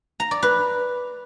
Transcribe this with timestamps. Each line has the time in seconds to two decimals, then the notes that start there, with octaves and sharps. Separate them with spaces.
0.20 A#5
0.31 D5
0.43 B4